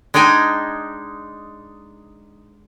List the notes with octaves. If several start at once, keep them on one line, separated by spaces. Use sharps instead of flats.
G#3 D4 D#4 G5 G#5